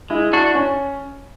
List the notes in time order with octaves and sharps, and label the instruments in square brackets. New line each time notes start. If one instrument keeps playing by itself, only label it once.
[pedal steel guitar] G#3 [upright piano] E4
[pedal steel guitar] D4 F#4
[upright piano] C#4